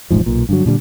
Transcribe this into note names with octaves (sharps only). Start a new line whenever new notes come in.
E1 A1 G#2 F3
B1 A#2
G2 D3 F#3
A#2 D3 F#3 G3